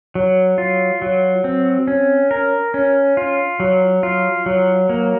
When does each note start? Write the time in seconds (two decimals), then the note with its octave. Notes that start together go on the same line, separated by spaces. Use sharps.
0.15 F#3
0.58 F4
1.02 F#3
1.44 C4
1.88 C#4
2.31 A#4
2.74 C#4
3.17 F4
3.60 F#3
4.03 F4
4.46 F#3
4.89 A#3